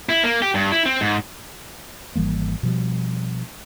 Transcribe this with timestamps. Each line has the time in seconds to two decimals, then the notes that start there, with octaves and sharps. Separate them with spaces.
0.09 E4
0.24 A#3
0.42 G4
0.55 G2
0.72 E4
0.86 C4
1.01 G#2
2.16 G#1 E3 G3 A#3
2.63 B2 F3 G3